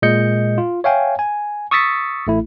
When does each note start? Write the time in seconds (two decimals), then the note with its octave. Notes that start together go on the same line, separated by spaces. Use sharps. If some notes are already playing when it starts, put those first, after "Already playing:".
0.02 A#2 G#3 D#5 G6 C#7
0.58 F4
0.84 C#5 E5 F5 G5 G#5
1.19 G#5
1.71 C#6 D#6 E6 A6 B6 C#7
2.27 A1 A3 E4